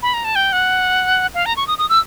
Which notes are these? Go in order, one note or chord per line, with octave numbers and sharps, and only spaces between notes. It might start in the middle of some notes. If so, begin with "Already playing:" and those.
B5
A#5
A5
G5
F#5
F5
A#5
C#6
D#6
D#6
E6